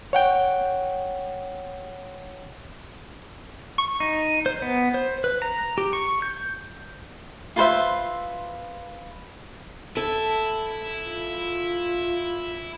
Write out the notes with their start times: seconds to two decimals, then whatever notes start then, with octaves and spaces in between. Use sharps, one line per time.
0.13 C#5 F#5 G5
3.78 C#6
4.00 D#4
4.46 C5
4.62 B3
4.94 C5
5.24 B4
5.42 A#5
5.78 G4
5.93 C#6
6.22 G6
7.56 F4 B4 C5 E5
9.97 E4 A4
11.05 F4